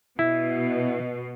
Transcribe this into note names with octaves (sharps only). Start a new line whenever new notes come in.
B2 E4